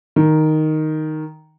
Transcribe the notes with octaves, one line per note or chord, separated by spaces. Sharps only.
D#3